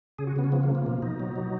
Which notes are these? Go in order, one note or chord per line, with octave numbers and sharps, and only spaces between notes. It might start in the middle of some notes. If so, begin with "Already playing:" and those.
C#3 G#4
F#4
C#3 B3
C#4
F3 B3
A#3
F3
A#3
B2 A#3
B2 D#4
F#3
F#3